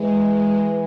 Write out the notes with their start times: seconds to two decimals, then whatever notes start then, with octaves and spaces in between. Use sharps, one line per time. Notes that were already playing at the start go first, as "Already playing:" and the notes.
Already playing: E3 G#3